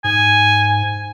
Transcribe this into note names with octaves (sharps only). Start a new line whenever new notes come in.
G#2 G#5